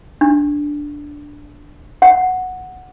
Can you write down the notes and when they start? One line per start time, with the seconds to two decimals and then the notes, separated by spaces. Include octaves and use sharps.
0.21 D4
2.02 F#5